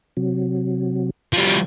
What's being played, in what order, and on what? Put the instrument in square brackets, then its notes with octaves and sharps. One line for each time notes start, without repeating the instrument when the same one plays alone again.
[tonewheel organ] C3 F#3
[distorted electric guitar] F3 G3